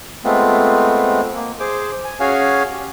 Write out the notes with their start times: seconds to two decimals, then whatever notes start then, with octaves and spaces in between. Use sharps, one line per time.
0.24 G#3 A3 B3 C4 F4
1.35 A#3
1.60 G#4 C5 D6
2.05 G#5
2.20 C#4 F#4 G#4 C#5 F5 G#5
2.72 G4